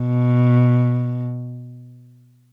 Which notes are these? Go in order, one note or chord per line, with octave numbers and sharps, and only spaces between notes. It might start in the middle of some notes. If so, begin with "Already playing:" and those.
Already playing: B2